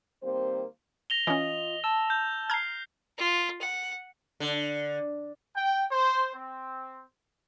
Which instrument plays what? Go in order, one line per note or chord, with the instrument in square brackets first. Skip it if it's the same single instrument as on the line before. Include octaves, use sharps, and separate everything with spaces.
[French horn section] D#3 G3 A#3 C4 C5
[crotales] A#6 F7 G7
[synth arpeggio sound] E3 C#4 [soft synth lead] F4 [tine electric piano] D#5
[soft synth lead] A5 [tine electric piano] E6
[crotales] G6
[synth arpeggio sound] A#5 G#6 [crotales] F6 C7
[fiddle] F4
F#5
[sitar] D3
[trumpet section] G5
C5
C4